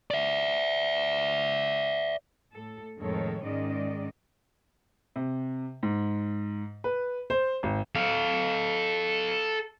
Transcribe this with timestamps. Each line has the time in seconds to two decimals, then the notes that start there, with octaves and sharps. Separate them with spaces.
0.11 D5 E5
2.54 A2 A4
2.98 F2 A2 D#3 G#3 A4 C#5
3.43 G#2 D#3 G#3 C#4 D5 D#5
5.16 C3
5.83 G#2
6.84 B4
7.30 C5
7.63 G#1
7.95 A4 F5